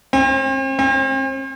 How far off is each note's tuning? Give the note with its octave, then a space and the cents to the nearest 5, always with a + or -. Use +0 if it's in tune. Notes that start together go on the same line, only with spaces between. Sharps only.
C4 +40
C4 +40